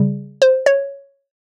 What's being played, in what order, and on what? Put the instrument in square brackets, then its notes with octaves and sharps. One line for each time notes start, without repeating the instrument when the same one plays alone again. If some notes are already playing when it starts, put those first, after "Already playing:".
Already playing: [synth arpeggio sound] C#3 G3
C5
C#5